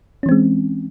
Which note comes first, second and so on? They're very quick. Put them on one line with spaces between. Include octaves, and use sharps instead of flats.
C#4 E3 C4 G#3